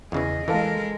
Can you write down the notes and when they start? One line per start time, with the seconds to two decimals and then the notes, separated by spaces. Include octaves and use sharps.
0.12 E2 C#3 E3 G#4 D#5
0.48 E3 G#3 A4 A#4 F5 A5